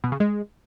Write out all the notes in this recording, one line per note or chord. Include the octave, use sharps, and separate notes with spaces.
B2
C#3
G#3